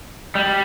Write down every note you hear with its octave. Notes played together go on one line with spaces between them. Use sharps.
G3